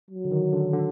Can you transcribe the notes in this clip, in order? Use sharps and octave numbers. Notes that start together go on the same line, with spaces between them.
F#3
D3
D#3
D3
D3